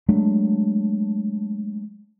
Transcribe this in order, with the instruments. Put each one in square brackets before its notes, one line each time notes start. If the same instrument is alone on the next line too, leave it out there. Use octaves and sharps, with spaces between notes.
[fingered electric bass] F#3 G#3 A3 D4